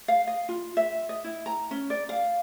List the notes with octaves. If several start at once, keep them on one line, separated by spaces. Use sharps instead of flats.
F5
D#5
F4
E5
D#5
E4
A#5
C#4
D5
F5